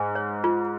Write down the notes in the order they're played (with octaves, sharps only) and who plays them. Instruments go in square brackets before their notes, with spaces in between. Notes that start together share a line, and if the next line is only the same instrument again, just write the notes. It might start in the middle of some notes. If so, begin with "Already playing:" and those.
Already playing: [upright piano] G#2 [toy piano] G#5
[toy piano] C#5
F4